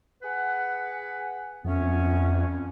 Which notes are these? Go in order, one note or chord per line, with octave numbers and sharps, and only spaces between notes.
G#4 B4 F#5
F2 A3 B3 C#4